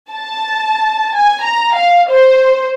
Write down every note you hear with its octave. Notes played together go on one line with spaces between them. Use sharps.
A5
G#5
A#5
F5
C5